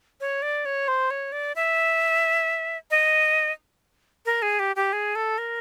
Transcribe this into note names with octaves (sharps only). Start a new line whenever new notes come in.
C#5
D5
C#5
C5
C#5
D5
E5
D#5
A#4
G#4
G4
G4
G#4
A4
A#4